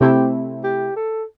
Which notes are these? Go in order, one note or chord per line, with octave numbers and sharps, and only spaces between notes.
C3 A3 C4 E4 G4
G4
A4